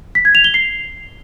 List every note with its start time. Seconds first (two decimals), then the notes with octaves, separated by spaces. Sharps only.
0.15 B6
0.25 G#6
0.35 F7
0.44 G7
0.54 C7